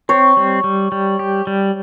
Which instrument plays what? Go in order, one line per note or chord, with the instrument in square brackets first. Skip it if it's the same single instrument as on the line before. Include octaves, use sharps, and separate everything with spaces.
[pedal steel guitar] C4 [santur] C#5
[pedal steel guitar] G3
G3
G3
G4
G3